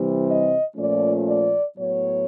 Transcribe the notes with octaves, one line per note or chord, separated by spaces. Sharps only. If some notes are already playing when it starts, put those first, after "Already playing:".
Already playing: C3 E3 G3 C4
D#5
A#2 F3 A3 C#4 D5
D5
A2 F#3 B3 C#5